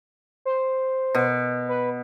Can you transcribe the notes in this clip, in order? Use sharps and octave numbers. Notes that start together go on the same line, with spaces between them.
C5
B2
B4